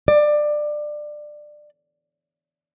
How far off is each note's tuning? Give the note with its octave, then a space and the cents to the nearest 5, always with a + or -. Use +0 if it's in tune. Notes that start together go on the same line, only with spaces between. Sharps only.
D5 +20